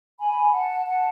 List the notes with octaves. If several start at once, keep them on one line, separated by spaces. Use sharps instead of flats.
G#5 B5
F#5 A5
F#5 A5